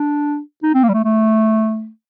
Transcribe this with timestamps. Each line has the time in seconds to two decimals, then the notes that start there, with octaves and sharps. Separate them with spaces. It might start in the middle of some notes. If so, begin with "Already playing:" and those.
Already playing: D4
0.63 D#4
0.74 C4
0.83 A#3
0.89 G3
0.94 A3
1.04 A3